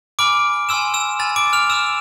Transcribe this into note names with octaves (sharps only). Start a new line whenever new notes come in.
G#5 B5 D6 F6 D7
G#5 C6 E6 F6 E7
E6 E7
G#5 B5 F6 A6
D6 D7
F6 F7
B5 D6 E6 F6 E7